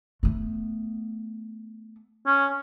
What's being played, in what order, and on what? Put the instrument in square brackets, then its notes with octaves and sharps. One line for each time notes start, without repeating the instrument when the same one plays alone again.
[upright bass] A3 B3
[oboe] C#4